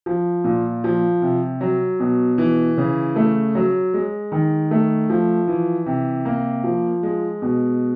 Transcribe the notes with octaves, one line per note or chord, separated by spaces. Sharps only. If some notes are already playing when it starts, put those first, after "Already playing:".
F3
A#2
F3
C3
F#3
B2
E3
C#3
A3
F#3
G#3
D#3
A3
F3
E3
C3
A#3
F3
G#3
B2